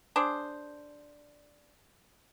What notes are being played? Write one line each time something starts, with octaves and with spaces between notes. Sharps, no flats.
D4 G#4 C5